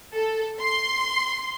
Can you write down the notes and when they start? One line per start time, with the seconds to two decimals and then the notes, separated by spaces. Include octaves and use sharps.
0.14 A4
0.60 C6